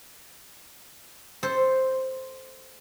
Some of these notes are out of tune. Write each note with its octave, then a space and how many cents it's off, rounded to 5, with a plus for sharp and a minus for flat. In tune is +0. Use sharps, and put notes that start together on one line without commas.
A4 +0 C5 +0